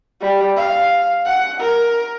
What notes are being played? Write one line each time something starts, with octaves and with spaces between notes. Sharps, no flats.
G3
F5
F#5
A#4